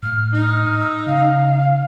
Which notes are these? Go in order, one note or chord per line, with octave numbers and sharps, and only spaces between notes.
A2 F6
D#4
E6
C#3 F5